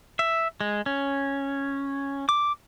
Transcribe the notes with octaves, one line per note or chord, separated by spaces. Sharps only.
E5
G#3
C#4
D6